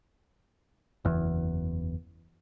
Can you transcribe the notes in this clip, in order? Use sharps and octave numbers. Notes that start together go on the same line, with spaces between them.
F#1 E2